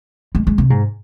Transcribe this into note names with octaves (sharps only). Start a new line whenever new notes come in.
G#3
G#3
C3
G#2